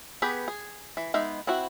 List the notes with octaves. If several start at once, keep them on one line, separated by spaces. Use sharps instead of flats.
B3 G4 G#4 B4
G#4
E3
G#3 B3 D#4 E5
C4 E4 F#4